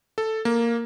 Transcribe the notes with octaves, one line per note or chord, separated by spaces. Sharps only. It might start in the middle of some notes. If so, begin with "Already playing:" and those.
A4
A#3